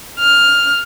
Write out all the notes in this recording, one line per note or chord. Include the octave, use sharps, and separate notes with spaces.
F6